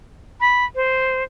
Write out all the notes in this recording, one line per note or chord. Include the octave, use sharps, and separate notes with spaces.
B5
C5